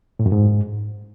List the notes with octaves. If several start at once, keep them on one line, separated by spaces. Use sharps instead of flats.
A2
F#2
G#2